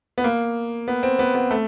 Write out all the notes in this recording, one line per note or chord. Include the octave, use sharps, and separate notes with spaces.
B3
A#3
B3
C4
B3
B3
A3